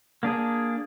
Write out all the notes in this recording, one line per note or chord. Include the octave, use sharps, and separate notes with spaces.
A#3 D4 G#4